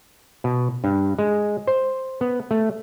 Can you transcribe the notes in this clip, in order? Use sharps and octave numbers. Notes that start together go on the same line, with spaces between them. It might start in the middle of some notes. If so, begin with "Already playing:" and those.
B2
G2
G#3
C5
B3
A3